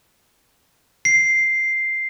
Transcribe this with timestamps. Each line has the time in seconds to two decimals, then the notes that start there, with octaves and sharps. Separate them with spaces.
1.05 C7